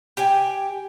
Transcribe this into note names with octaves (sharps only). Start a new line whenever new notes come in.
G4 G5 G#5